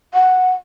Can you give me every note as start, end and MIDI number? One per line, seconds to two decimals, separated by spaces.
0.14 0.51 78